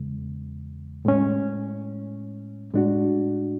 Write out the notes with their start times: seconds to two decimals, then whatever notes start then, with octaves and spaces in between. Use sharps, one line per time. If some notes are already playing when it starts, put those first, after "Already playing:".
Already playing: E2 C#3 G#3
1.05 A2 G#3 C#4
2.73 A2 G#3 D4 F#4